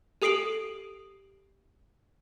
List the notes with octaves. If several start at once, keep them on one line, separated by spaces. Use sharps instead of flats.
G4 A4 D#6 C7 D7 F#7